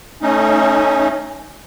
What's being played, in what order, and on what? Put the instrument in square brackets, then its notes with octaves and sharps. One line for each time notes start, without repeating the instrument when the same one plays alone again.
[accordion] A3 C#4 D#4